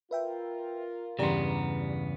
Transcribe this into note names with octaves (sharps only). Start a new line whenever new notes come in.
F4 A#4 B4 E5 G5
E2 G2 C#3 B3 G4 D5 A#5 C6